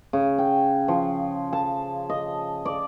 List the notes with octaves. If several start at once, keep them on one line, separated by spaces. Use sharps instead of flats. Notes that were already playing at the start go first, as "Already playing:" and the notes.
C#3
G5
F3
A5
D#5
D5